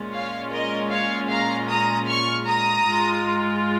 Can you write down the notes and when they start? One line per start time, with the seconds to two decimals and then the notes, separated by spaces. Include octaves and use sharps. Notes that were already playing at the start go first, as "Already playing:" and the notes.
Already playing: A#2 G#3 C#4 F4
0.13 C#5 F5
0.52 A#4 D#5
0.91 C#5 F5
1.30 F5 A#5
1.69 A#5 D#6
2.09 C#6 F6
2.47 A#5 D#6
2.86 G#2 G#3 F4